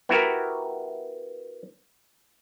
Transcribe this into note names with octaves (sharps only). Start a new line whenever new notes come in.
B3 E4 F#4 G4 A#4